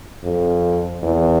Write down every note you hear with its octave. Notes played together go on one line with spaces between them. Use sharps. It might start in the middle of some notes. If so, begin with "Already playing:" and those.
F2
E2